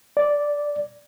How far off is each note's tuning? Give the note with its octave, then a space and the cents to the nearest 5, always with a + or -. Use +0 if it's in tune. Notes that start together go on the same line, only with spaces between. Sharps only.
D5 -5